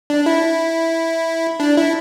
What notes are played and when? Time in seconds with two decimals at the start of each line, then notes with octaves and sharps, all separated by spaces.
0.10 D4
0.26 E4
1.60 D4
1.77 E4